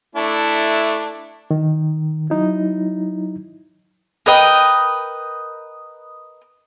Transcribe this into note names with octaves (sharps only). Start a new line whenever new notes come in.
A3 D4 E4
D#3
F#3 D#4 E4
A#4 B4 D#5 G5